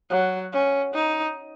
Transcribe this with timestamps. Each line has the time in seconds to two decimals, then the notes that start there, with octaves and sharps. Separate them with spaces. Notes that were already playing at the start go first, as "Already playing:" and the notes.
0.10 F#3
0.53 C#4
0.94 D#4